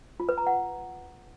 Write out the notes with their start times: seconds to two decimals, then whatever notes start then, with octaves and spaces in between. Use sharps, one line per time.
0.20 F4
0.29 B4
0.38 A#5
0.47 F#5